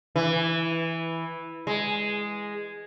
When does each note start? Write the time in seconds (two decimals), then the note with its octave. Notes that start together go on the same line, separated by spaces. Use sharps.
0.16 E3
1.67 G#3